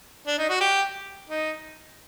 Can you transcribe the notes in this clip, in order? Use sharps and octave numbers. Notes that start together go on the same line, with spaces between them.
D4
D#4
F#4
G4
D#4